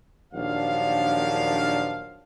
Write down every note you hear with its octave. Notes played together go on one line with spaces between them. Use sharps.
A#1 D#2 F3 F#3 D4 F5